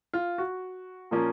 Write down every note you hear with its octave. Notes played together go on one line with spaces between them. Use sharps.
F4
F#4
A#2 F3 A#3 C#4